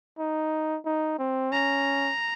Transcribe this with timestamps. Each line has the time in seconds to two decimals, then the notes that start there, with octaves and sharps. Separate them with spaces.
0.19 D#4
0.85 D#4
1.19 C4
1.52 C#4 A#5